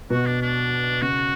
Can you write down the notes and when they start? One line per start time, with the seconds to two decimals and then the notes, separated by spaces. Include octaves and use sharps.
0.10 B2 F#4
0.26 D4
0.42 D4
1.02 C#3 F#4